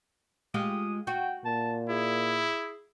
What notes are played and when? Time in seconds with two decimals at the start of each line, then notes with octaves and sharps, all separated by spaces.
0.54 G#3 F4 G4 D#6
1.07 F#4 G5
1.45 A#2 A5
1.90 E4 G#4